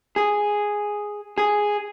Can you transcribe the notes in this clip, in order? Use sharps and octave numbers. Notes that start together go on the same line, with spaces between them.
G#4
G#4